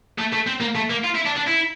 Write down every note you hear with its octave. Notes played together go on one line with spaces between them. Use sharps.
A3
A3
C4
A#3
A3
A#3
F4
E4
D4
D4
E4